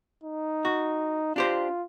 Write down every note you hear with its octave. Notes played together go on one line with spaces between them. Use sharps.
D#4
F#4
D4 F4 G4 C5